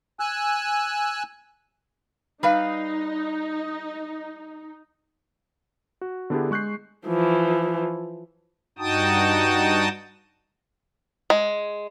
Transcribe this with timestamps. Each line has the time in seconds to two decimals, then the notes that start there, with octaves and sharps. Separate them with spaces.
0.20 G#5 E6 F#6
2.43 G3 D#4 B4 F5
6.01 F#4
6.30 D3 B3 D4 E4 G4 G#4
6.51 G#3 C#6 F#6 G6 C7
7.06 E3 F3
8.79 G2 D#4 F#4 G5 A5 D#6
11.30 G#3